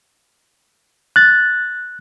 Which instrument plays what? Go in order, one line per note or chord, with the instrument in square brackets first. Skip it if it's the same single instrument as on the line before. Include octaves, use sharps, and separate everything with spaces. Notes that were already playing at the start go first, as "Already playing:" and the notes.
[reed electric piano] F#6 A6